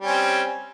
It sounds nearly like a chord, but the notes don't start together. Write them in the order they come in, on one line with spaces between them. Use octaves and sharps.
G3 C#4 C4